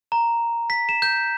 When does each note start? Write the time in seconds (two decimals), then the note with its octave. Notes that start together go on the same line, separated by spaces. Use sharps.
0.12 A#5
0.70 B6
0.89 E7
1.02 G6